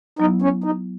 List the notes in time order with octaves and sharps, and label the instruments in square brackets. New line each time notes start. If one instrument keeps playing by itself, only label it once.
[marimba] F#3 B3 E4 [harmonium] D#4
[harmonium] C#4
D#4